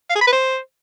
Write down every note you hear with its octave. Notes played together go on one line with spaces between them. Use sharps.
F5
G#4
B5
B4
C5